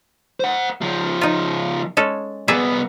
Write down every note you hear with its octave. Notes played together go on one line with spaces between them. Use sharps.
C5 F#5
C#2 F3
D#4 F4
G#3 C#4 A4
C2 B3 G#4 D5 E5